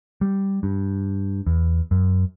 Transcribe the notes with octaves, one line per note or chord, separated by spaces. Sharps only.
G3
G2
E2
F#2